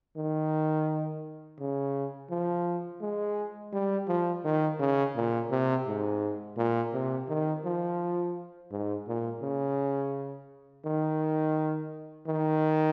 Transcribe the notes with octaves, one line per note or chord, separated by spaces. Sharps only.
D#3
C#3
F3
G#3
G3
F3
D#3
C#3
A#2
C3
G#2
A#2
C3
D#3
F3
G#2
A#2
C#3
D#3
D#3